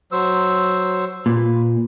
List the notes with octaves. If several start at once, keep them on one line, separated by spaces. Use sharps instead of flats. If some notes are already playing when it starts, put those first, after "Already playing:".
F#3 C5 E6
A#2 B4